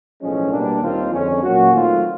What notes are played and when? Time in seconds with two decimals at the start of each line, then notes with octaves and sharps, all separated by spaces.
0.21 B1 A2 F3 G#3 C#4
0.52 B2 G3 A#3 D4
0.81 D#2 D#3 G3 C4 F4
1.12 F2 D3 F3 G#3 C#4
1.43 A#2 F#3 A#3 C#4 F#4
1.73 D#3 F#3 A3 C4 F4